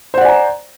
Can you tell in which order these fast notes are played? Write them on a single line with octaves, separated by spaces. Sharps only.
C5 F#5 D5 G#5 A#5